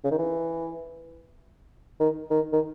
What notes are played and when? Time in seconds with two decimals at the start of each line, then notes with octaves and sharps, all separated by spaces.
0.04 C#3
0.11 D#3
0.18 E3
2.00 D#3
2.31 D#3
2.53 D#3